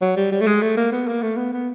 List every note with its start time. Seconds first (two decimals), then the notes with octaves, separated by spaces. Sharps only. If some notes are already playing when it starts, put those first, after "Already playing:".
0.02 F#3
0.17 G3
0.32 G3
0.41 A3
0.47 G#3
0.62 A3
0.77 A#3
0.92 B3
1.07 A#3
1.22 A3
1.37 B3
1.53 B3